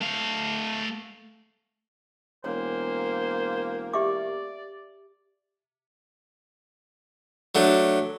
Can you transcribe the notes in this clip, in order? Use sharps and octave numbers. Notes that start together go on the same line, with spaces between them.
A3 F5
E1 A#3 C5 C#5
G4 D5 E5 D6
F#3 A3 D4